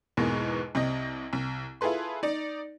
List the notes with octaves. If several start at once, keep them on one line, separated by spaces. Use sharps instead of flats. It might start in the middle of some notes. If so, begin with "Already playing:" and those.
E2 G#2 B2 G#3 A#3 B3
C2 C3 D#5
C2
E4 F4 G#4 A4 B4 C6
D#4 D5